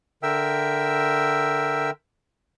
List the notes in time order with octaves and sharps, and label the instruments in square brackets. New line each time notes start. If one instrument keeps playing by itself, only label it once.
[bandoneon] D3 A#4 E5 G5 E6